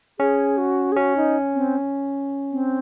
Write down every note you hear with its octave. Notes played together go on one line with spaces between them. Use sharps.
C#4 G#4
F#4
G#4
C#4 F#4
D#4
C4
C4